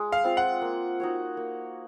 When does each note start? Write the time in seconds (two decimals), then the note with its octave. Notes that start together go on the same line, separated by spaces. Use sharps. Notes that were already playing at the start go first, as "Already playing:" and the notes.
Already playing: G#3
0.12 F5
0.24 C4 F4
0.37 F#5
0.62 A#3
1.00 D#4 F#4 C#5
1.37 A#3